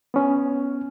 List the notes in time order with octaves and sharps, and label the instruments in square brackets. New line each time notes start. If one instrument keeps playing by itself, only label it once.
[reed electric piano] B3 C#4